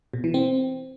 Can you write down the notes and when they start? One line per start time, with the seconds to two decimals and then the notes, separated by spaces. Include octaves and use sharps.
0.14 B2
0.24 E3
0.34 C4